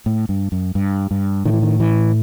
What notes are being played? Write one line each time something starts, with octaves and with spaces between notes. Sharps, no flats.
A2
G2
F#2
G2
G2
A2 D#3
E3
D#3
E3